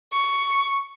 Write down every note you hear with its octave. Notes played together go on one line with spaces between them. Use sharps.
C#6